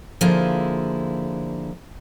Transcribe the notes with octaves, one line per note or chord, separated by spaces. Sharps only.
D3 F3 A#3 E4 G#4 C5